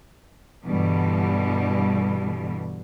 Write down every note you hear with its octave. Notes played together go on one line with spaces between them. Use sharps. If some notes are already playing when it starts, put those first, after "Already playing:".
G2 B2 D3 E3 G3